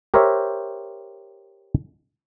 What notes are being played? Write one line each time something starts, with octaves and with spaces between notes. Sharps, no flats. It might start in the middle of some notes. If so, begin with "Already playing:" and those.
G4 A#4 C5 C#5 E5